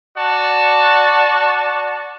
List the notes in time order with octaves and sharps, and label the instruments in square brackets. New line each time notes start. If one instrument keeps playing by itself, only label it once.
[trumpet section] F#4 D5 A5